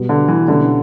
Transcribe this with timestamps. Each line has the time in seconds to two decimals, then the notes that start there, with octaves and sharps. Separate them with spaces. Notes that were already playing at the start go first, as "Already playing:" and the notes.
Already playing: B2 G3 B3 F#4
0.09 D3
0.28 E3
0.48 B2 D3 G3 C#4 E4